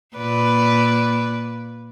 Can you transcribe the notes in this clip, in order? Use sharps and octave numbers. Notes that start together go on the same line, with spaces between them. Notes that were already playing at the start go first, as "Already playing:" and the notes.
A#2 B4 D5